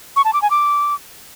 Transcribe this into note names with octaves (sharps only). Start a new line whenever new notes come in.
C#6
A5
D6
G#5
D6